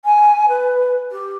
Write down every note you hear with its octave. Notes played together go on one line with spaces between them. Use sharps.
G#5
B4
G4